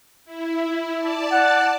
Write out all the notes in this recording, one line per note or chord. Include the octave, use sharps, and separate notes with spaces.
E4
D5 A5
F#5